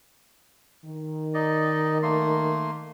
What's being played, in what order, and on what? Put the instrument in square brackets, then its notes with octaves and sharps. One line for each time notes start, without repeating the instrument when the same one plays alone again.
[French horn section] D#3
[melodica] D#4 D5 D#5
A3 A#3 C6